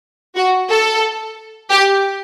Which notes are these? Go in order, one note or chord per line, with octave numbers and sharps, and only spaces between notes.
F#4
A4
G4